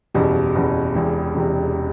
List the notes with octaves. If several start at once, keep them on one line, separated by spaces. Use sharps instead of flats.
F#1 E2 B2 G3
F#1 E2 B2 G3
E1 E2 C3
E1 E2 C3